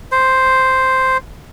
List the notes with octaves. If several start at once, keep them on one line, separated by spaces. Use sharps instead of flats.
C5